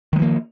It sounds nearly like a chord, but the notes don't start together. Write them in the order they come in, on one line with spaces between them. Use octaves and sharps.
D#3 G#3 F3 A#3